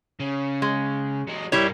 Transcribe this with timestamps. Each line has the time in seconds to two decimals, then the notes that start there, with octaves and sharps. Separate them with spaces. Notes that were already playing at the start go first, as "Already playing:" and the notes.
0.20 C#3
0.62 G#3
1.28 F#3 G#3
1.52 G2 G3 A#3 E4 C#5